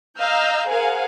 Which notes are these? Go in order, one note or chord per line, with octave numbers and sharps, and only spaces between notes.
D#5 F5 A#5 E6 F6 G6
G#4 A#4 C5 F5 F#5 G#5